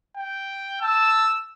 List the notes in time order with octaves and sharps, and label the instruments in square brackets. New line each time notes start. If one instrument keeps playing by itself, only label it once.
[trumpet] G5
[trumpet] A5 [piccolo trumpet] E6